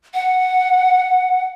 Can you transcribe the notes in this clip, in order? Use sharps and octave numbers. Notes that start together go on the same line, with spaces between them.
F#5